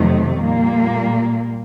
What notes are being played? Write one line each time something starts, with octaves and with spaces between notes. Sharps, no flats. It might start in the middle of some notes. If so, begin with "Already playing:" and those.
Already playing: F2 C3 D#3 F#3 A3
A#2 G3 A#3